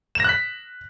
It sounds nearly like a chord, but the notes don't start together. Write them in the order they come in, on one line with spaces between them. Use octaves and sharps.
E7 A#6 F#6 B6